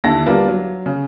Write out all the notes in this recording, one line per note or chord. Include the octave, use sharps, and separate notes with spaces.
D#2 D3 E4 A5 A#6
G3 A#3 B3 D4 F4
F#3
C#3